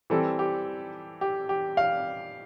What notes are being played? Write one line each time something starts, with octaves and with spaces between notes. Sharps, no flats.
E3 G3 C4 A4
G4
G4
G4
F5